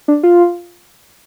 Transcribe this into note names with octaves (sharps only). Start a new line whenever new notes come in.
D4
F4